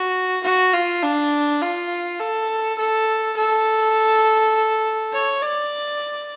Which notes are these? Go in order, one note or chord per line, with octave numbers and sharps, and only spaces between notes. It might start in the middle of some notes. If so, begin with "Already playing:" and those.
Already playing: F#4
F#4
F4
D4
F4
A4
A4
A4
C#5
D5